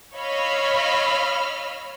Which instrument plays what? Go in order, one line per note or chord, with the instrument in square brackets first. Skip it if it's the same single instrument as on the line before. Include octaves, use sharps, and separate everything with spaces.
[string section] C#5 D#5 F5 B5 E6 F6